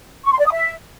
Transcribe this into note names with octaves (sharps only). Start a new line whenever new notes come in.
C#6
C6
D5
D#6
E5